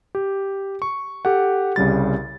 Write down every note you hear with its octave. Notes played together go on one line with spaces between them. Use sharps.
G4
C#6
G4 A4 F#5
C2 C#3 G3 A6